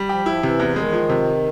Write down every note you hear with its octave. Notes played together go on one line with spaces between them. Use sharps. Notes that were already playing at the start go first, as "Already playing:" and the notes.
Already playing: G3
F3 G4
F3 E4
C3 E3
E2
D#3 G#3
F3
C3